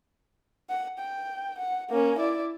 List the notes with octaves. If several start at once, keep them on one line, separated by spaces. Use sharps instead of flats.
F#5
G5
F#5
A#3 C#4
E4 D5